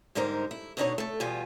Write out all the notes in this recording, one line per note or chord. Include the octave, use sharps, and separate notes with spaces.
G#2 D3 G3 D#4 A#4 C5
E4
B2 D3 C4 D4 D#4 C#5
A3 A4
E2 B2 G3 F4 G4 G#5